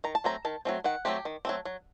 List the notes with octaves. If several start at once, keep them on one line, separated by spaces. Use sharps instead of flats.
D#3 A#5
A5
F#3 A3 C4 A#5
D#3 A5
F#3 A3 C4
D#3 F#5
F#3 A3 C4 G4
D#3
F#3 A3 C4
F#3